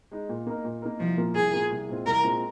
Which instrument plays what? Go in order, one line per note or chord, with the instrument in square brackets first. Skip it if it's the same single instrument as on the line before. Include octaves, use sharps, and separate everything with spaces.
[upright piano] G#3 D#4
A#2
A#3 D#4 A#4
A#2
A#3 D#4 A#4
[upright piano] C2 [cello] F3
[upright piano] A#2 A#3 F4 A#4
[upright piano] C2 [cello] G#4
[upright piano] A#2 A#3 F4 A#4
C2
A#2 G#3 C4 F4
[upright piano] C2 [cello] A#4
[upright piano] A#2 G#3 C4 F4